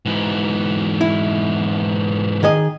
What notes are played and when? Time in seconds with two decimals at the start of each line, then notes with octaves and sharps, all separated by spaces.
0.06 G#2 E3
1.01 E4
2.43 D#3 G#4 D#5